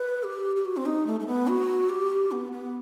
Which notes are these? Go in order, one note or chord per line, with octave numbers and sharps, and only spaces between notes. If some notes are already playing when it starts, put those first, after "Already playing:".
Already playing: B4
G4
G4
F#4
C4
D#4
A3
A3
B3
F#4
G4
B3
B3